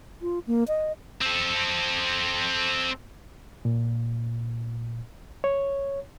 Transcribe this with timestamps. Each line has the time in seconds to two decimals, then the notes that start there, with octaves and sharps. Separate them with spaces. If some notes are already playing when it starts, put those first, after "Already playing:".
0.22 F4
0.47 A#3
0.68 D#5
1.21 C4 A4
3.65 A#2
5.44 C#5